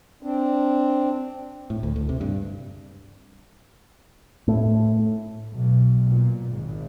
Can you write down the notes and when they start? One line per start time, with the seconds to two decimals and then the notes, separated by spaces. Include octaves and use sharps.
0.23 C4 D4
1.70 A2
1.83 D2
1.96 D2
2.09 C3
2.21 G2
4.48 A2
5.54 B1
6.08 A#2
6.50 G#1